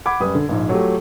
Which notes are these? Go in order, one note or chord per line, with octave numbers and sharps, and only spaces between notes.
F#5 B5 D6 G#6
F#2 G3 B4 D#6
D3
A#1 G#2
F#3 A3 F4 G4